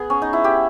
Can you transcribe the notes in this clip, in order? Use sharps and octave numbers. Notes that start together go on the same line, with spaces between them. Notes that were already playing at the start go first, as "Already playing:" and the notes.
Already playing: B3 G#4
C#4
D#4
E4
G4